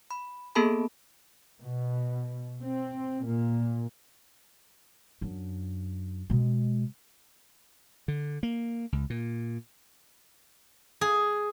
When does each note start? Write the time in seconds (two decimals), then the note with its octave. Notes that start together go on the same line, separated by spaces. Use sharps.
0.11 B5
0.55 A#3 B3 G#4 A4 A5 B5
1.61 B2
2.60 C4
3.23 A#2
5.21 F#2 D4
6.30 B2 G#3
8.08 D3
8.43 A#3
8.92 C#2
9.10 A#2
11.01 G#4